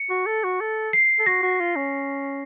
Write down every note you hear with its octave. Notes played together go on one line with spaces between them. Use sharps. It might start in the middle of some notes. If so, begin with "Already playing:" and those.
Already playing: C#7
F#4
A4
F#4
A4
C7
A4
F#4 A#6
F#4
F4
C#4